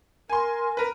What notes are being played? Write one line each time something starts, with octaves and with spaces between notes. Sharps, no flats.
A#4 G#5 C6
A#4 B4